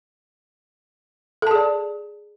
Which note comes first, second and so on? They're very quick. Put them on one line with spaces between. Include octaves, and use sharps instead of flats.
A4 A5 G#4 D5